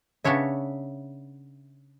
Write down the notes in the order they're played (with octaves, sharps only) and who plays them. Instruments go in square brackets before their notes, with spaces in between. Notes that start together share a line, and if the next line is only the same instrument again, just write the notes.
[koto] C#3 B3 D4 C#5 E5